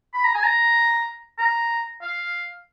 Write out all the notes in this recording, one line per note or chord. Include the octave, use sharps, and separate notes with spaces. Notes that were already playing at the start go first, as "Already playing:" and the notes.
B5
A#5
G#5
A#5
A#5
F5